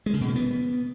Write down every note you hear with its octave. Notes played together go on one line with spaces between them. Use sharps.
G#3
C#3
B2
A#3
B3